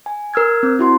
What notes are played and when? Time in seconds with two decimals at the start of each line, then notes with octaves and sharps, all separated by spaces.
0.06 G#5
0.34 A#4 E6 F6 G#6
0.63 C4
0.79 E4 F#4 C6